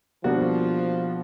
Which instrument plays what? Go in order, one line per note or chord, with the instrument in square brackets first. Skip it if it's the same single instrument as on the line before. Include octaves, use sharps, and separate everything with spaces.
[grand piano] B2 G3 A#3 D4 F#4 [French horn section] F3